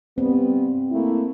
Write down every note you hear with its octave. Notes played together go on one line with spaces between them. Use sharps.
G2 G3 B3 C4
A3 A#3 E4